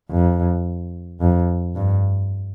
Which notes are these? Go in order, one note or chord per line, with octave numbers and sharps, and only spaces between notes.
F2
F2
G2